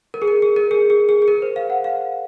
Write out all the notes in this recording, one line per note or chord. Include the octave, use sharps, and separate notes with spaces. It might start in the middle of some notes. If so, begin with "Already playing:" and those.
A#4
G#4
A#4
G#4
A#4
G#4
G#4
G#4
G#4
A#4
C5
F5
F#5
F5